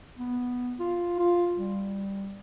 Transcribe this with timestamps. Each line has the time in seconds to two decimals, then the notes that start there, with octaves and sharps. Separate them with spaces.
0.18 B3
0.80 F4
1.19 F4
1.57 G3